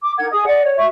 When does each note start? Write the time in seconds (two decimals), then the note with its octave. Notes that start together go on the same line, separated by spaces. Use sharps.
0.02 D6
0.18 D#4 A#4 F#5 G#6
0.31 G#4 D#5 D#6
0.46 D5 D#5 F#5
0.63 C#5
0.77 F#4 E5 C#6